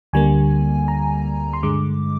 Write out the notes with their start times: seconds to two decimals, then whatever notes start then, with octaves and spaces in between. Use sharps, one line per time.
0.13 D2 D3 G3 A#3 G#5
0.88 A#5
1.53 C6
1.63 G2 D3 G#3 D6